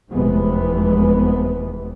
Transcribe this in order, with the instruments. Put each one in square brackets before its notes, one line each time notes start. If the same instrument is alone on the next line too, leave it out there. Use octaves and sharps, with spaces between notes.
[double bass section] F1 E2 C3 E3 G#3 B3